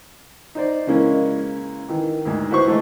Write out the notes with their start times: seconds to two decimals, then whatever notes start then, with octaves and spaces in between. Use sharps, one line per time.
0.55 D#4 C5 D5
0.87 C#3 E3 G#3 A#3 C#4 E4
1.89 D#3 E3
2.25 D2 G#2
2.51 E4 F#4 B4 C5 C#6
2.67 E3 G#3 A3 D#4 A4